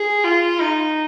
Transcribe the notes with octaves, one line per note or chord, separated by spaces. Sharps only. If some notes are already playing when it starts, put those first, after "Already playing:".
Already playing: G#4
F4
D#4